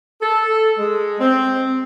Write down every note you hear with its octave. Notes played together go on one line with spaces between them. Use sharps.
A4
G#3
C4